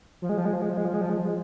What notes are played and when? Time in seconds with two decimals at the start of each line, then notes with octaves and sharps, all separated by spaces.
0.22 F3
0.29 G#3
0.37 F3
0.45 G#3
0.53 F3
0.62 G#3
0.70 F3
0.77 G#3
0.85 F3
0.93 G#3
1.01 F3
1.10 G#3
1.18 F3
1.25 G#3